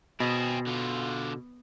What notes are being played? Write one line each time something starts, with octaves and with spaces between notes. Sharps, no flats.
B2 C4 G#4
D3 F4